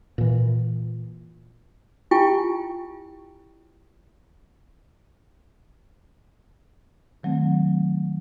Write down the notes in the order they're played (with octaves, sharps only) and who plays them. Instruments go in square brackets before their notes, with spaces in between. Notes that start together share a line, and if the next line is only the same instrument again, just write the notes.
[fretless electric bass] A#2 E3
[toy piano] E4 F4 G4 G5 G#5
[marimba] D#3 F#3 A3 C4